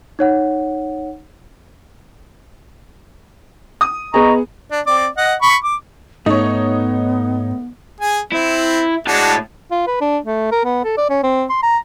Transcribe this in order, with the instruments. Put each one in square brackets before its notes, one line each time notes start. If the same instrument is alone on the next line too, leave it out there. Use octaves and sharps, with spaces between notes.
[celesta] D#4 C#5 F#5
[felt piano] D#6
[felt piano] B3 G#4 [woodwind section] D#5 A#5 C#6
[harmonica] D4
C4 D5
D#5 F#5
B5 C#6
D6
[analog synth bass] G#2 [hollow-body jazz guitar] A3 [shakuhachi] B3 [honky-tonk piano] D#4 C#5
[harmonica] G#4 G#5
[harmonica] C4 [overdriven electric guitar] E4
[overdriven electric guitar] A2 A5 [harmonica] G#3 D4 F#4
[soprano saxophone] F4
B4
D4
A3
A#4
B3
A4
D5
C#4
C4
C6
A#5